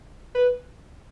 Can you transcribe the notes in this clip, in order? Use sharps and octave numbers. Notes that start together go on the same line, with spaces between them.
B4